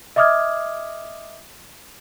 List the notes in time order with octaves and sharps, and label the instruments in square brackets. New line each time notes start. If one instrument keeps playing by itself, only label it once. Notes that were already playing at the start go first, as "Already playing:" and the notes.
[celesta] D#5 E5 D6 D#6 F6 G#6